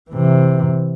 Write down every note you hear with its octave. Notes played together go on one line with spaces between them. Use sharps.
C3 E3